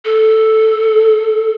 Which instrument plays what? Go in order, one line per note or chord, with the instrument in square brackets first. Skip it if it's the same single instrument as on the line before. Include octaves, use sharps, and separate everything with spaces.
[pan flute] A4